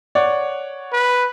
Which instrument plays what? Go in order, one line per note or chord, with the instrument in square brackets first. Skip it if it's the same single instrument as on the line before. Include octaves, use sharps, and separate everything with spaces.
[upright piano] C#5 D5 F#5
[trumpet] B4